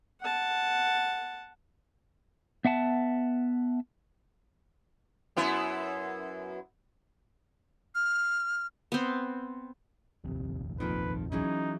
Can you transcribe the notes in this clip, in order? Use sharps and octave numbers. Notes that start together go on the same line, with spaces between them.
F#5 A5
B3 E5 F#5 A5
F#2 B3 E4
F6
B3 C4
F1 A#1 D#2 C3
F2 D#3 F3 A#3 B4
E3 F#3 C#4 D#4 G#4